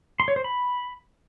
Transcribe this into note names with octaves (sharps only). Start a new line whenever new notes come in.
C6
C#5
C5
B5